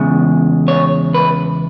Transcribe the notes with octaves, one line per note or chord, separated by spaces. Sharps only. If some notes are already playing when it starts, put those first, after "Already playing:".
Already playing: E2 C#3 G#3
C#5
B4